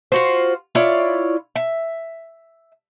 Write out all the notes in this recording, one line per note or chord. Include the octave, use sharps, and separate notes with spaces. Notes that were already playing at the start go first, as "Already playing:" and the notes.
F4 F#4 C5
E4 F4 C#5 D5
E5